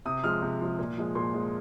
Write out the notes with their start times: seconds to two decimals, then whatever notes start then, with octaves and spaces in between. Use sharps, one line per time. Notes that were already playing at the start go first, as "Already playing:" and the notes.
0.05 C3 D#6
0.23 F3 G#3 F6
0.42 C3
0.61 F3 G#3
0.79 A#2
0.97 F3 G#3
1.15 A#2 C6
1.34 F3 G#3